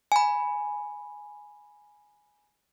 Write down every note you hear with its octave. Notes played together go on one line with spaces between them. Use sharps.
G#5 B5